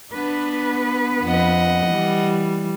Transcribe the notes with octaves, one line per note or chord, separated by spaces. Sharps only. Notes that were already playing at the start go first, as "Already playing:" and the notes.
B3 D4 B4
F2 D#5 F#5
E3 G3